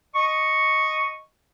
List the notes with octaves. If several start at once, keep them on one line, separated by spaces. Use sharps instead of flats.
D#5 C#6